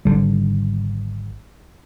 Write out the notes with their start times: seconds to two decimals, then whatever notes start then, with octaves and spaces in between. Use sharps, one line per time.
0.05 G#1 D3 G3